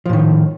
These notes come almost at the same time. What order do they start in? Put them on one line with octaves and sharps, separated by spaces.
F3 A2 D#3